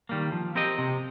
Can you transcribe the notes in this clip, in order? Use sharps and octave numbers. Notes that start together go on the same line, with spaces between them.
D#3 G3 A#3
F3
C4 G4 A#4 D#5
C3